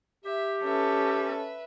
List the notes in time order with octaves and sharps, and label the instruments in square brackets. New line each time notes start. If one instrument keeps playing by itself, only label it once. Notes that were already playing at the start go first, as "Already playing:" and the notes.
[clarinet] G4 [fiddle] E5
[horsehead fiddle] C#4 A4 [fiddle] B4 E5